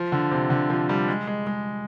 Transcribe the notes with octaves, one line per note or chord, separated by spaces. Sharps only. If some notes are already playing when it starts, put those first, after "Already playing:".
Already playing: F3
D3
C3
D3
F3
G3
G#3
G#3
G#3